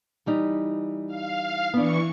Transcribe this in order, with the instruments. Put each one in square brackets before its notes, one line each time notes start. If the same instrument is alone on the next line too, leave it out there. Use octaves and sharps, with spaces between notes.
[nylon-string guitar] E3 G3 D#4
[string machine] F5
[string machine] E3 C#6 C#7 [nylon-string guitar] B3 D4